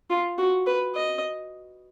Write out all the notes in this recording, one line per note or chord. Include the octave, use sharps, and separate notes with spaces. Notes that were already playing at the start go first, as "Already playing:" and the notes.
F4
F#4
B4
D#5